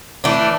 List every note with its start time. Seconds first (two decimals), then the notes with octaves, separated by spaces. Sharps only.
0.24 E3 A3 D4